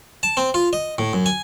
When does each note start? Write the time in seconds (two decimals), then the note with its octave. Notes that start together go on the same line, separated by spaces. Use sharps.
0.23 A5
0.37 C4
0.54 F4
0.73 D#5
0.98 A2
1.13 F#2
1.26 G#5